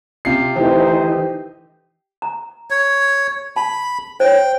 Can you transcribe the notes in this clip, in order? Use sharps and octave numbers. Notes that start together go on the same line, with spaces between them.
C3 F4 C7
D2 E3 A3 D#4 G4 C5
A#5
C#5
A5 B5
C5 C#5 G5